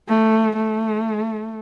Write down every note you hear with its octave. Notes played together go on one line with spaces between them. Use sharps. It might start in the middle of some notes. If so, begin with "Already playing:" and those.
A3
A3